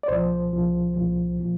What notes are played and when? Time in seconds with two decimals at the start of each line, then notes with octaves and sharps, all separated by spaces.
0.03 D5
0.08 C2 A#2 F3 C5
0.52 C2 A#2 F3
0.96 C2 A#2 F3
1.40 A#2 F3